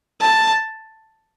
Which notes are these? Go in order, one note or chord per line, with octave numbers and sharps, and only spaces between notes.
A5